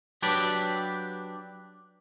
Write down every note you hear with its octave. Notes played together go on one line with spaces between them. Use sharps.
F#3 D4 G4 B4 D5